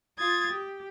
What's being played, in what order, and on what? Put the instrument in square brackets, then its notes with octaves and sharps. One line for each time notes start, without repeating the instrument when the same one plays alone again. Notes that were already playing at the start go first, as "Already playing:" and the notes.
[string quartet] F4 D#6 G#6 A6
G4